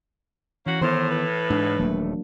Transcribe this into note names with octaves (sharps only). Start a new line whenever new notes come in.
E3 A#3 C#4 F#4
A2 D#3 B3 C5
B4
G#2 D4
D#1 F#3 A3 A#3